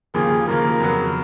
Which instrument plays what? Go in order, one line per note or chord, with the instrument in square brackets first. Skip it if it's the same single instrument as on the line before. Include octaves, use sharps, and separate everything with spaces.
[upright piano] D#2 C#3 F3 A#3 [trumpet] G#4
[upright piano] D#2 C#3 F3 A#3 [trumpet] A#4
[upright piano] F2 C#3 F#3 B3